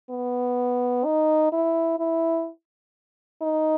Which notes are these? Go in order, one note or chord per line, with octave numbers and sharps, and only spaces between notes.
B3
D#4
E4
E4
D#4